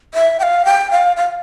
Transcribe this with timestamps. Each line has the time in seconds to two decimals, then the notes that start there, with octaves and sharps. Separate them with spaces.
0.14 E5
0.40 G5
0.43 F5
0.65 G5
0.91 F5
1.17 F5